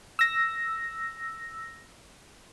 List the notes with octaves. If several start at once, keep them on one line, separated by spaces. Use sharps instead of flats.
E6 A#6